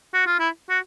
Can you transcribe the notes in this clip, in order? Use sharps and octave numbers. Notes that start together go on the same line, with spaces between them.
F#4
F4
E4
F#4